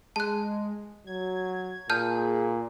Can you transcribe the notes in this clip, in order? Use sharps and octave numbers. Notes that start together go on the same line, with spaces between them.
G#3 A5 F#6
F#3 G#6
A#2 G#4 A5 F6 G6